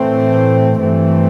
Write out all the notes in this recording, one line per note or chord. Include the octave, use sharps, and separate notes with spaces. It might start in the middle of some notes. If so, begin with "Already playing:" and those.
Already playing: A2 E3 A3 C4
G2 E3 A3 C4